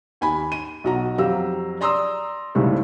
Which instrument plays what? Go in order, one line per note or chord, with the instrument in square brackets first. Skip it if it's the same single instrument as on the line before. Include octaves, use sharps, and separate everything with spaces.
[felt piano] D#2 G#5 B5
D#7
B1 F#4 A#5
F2 F#3 G4 F5 A#5 E6
D5 A#5 C6 D#6 E6
C2 G#2 C#3 G3 A3